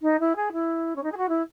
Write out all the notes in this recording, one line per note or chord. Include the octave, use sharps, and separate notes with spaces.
D#4
E4
G#4
E4
C#4
D#4
G#4
F#4
E4